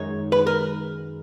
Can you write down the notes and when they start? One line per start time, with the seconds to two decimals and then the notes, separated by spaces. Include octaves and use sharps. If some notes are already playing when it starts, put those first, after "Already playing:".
Already playing: F#2 D#3 G#3 D#4 G#4 C#5
0.32 B4
0.47 A#4